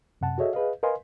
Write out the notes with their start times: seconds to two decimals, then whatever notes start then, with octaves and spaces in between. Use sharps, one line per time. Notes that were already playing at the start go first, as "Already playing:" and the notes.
0.21 F#2 C3 F#5 A5
0.38 F#4 G#4 A4 C#5 D#5 E5
0.53 G#4 B4 D#5 F5
0.83 A#4 B4 D#5 F5 G#5 C6